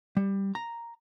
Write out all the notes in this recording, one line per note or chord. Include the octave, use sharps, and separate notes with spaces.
G3
A#5